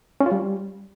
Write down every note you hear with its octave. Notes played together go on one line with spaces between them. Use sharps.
C#4
F4
G3